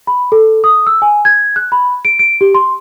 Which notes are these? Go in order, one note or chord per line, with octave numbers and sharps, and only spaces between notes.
B5
A4
D#6
E6
G#5
G#6
F#6
B5
D7
D7
G4
C6